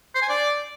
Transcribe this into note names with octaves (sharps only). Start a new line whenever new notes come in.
C5
G#5
D5